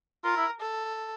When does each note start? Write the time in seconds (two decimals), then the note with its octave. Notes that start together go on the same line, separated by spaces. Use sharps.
0.24 F4 A#4
0.36 E4
0.60 A4